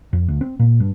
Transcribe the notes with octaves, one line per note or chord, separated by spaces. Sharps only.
F2
D2
C4
A#2
G2